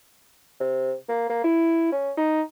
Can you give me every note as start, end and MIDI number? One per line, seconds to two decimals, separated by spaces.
0.61 0.94 48
1.09 1.28 58
1.30 1.40 58
1.44 1.91 64
1.92 2.12 61
2.17 2.42 63